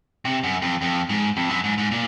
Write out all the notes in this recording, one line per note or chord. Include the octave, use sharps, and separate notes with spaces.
C3
F#2
F2
F2
G#2
F2
F#2
G#2
G#2
A#2